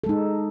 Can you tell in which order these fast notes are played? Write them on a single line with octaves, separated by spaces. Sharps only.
A4 G#3 D#4